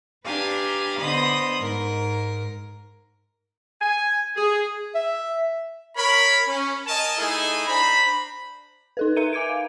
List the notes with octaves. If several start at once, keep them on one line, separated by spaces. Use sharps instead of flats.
D4 G4 B4 F5 G#5 A#5
D3 B3 C5 D#5 B5 D#6
G#2 A#4
G#5
G#4
E5
A#4 C#5 B5
C#4
A#4 D#5 G#5 A5
A3 D#4 E4 G#4 A4 G#5
D4 C5 A#5 B5
D#4 A4 B4
A#4 E5 A#5 D#7
G#5 D6 G#6 D7
F5